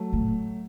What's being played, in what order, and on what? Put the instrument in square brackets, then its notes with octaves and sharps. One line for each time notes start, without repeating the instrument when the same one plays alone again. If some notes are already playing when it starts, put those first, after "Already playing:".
Already playing: [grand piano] F#3 A3
[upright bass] A2